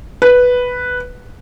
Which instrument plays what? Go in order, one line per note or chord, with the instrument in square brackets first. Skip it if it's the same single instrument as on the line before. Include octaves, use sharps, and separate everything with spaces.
[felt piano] B4